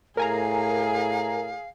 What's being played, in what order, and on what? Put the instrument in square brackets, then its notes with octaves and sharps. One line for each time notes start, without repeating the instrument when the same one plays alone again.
[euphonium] A2 [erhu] G#4 [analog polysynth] A#4 G#5 A#5 [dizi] F5